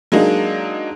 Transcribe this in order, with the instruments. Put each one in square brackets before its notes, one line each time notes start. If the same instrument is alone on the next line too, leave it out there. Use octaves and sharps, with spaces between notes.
[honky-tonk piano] F#3 G#3 A#3 D4 D#4